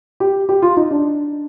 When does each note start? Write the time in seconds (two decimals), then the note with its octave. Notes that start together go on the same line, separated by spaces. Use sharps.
0.20 G4
0.49 G4
0.62 F4
0.77 D#4
0.91 D4